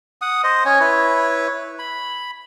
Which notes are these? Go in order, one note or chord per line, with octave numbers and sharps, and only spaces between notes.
F#5 D#6
C5 D#5
C#4 C#5 G#5
E4 B4 C#5
B5